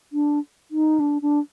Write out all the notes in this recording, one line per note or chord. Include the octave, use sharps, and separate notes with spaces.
D4
D#4
D4
D4